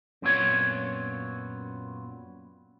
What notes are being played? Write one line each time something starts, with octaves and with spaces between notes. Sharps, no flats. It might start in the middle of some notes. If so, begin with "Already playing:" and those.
F#2 A#2 B3 C4 F4 C#5